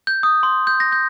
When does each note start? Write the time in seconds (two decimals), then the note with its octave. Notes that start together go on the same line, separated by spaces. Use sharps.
0.07 G6
0.23 D#6
0.43 C6
0.67 G6
0.80 A#6
0.92 G6